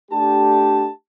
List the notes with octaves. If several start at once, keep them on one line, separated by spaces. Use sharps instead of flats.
A3 D4 G4 A5